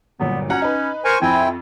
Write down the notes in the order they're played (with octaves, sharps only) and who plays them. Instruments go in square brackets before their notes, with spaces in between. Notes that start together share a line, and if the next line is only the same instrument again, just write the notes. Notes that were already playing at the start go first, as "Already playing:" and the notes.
[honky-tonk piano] G1 A#2 F#3 [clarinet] B3
[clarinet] C#4 [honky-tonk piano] F#4 F#5 A#5
[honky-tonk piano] D#4 B4
[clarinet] A#4 [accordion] C5 G#5 C#6
[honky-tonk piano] F2 [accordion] C4 E4 G5 [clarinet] G#5